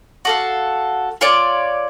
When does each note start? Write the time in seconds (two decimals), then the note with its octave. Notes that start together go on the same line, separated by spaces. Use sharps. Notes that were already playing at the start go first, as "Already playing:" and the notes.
0.25 F#4 A4 F5
1.21 F4 C#5 D5